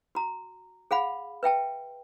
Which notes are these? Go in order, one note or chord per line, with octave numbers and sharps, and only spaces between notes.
F#4 A#5
G#4 F5 F#5 B5
B4 E5 G5 A5